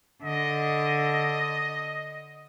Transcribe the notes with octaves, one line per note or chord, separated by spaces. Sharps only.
D3 D#5